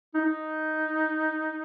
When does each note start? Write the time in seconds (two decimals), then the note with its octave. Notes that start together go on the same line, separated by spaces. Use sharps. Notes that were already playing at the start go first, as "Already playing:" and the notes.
0.14 D#4
0.25 D#4